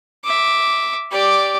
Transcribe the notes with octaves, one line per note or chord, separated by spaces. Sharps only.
E5 D6
G4 D5